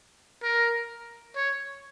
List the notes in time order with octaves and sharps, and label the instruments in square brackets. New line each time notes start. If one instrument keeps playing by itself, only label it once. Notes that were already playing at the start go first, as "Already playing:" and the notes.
[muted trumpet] A#4
C#5